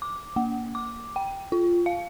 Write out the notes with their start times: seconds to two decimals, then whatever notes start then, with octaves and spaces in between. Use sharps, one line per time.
0.02 D6
0.36 A#3
0.75 D6
1.16 G5
1.52 F4
1.86 F5